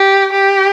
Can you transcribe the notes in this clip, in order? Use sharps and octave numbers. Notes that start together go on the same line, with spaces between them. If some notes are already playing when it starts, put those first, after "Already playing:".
Already playing: G4
G4